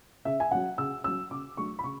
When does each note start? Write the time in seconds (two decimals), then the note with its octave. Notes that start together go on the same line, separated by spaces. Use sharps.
0.25 C#3 E5
0.40 G#5
0.51 F#3 C#4 F#5
0.78 C#3 E6
1.04 F#3 C#4 E6
1.31 C#3 D6
1.57 F#3 A3 D4 C#6
1.79 B5
1.84 C#3 C#6